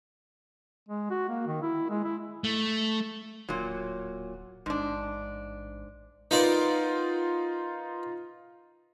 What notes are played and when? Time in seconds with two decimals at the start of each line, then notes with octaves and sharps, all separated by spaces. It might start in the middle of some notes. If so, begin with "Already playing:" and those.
0.89 G#3
1.10 F#4
1.29 A#3
1.47 D#3
1.62 E4
1.90 G#3
2.04 E4
2.44 A3
3.49 D1 A#2 F#3
4.66 A1 G#2 D4
6.31 B3 D#4 F4 A#4 D5